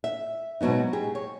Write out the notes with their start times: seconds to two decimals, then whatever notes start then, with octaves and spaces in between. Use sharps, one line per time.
0.04 E5
0.61 G#2 B2 F#3 B3 D#4
0.93 G4 G#4
1.15 C#5